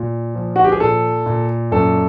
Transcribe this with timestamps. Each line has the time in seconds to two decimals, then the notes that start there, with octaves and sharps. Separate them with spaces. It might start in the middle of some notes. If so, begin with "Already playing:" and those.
Already playing: A#2
0.35 F3
0.56 F#4
0.65 G4
0.72 G#4
0.80 A#2 A4
1.26 A#2
1.72 F#2 A4